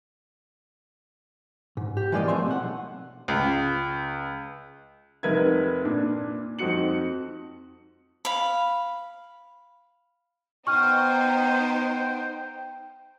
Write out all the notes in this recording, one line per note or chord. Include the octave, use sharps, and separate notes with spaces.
G#2
G4
E3 G3 G#3 A#3 D5 D#5
B1 F3 A3 C4 E5 C6
B1 F#5
C#2
F1 D#4 A#4 B4 E5 G#6
A#2 D4
F2 C4 D#4 F#4 C#7 F#7
F5 B5
B3 D#4 C5 G5 C#6 F6